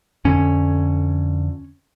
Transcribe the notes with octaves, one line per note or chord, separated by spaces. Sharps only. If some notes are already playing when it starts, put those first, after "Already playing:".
F2 D3 C#4